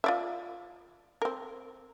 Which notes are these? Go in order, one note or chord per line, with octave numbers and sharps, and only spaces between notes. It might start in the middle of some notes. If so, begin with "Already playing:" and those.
F4 D5 E5
C4 A#4